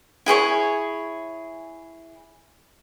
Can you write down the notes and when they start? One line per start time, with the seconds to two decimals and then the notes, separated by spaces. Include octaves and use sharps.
0.26 E4 G#4 C5 C#5